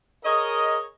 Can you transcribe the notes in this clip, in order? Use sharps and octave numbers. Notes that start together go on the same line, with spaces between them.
G#4 A#4 C#5 D#5